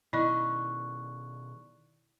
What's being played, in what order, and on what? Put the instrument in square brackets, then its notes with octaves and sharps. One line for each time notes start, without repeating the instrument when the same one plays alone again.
[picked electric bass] B2 D#3 [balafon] E4 D#5 [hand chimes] D5 C#6 F#6